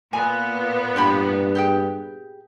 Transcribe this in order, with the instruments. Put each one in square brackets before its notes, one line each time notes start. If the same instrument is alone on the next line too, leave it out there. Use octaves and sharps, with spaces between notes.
[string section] A#2 B3 [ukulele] G#5
[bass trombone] G2 [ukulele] D4 G4 B5
[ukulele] G4 G#4 G5